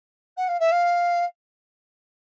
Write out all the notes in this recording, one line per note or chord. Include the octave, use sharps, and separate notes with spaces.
F#5
F5
E5
F5